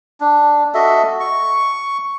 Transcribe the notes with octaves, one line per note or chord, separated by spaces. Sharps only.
D4
F#4 A4 D#5 E5
C#6